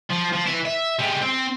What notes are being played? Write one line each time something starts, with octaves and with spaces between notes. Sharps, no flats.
F3
F3
E3 E4
E5
G3 G#3
C4